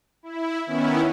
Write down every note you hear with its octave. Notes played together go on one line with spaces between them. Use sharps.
E4
D#3 B3 C#4 E4